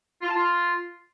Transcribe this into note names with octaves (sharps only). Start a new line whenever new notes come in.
F4
A5
F4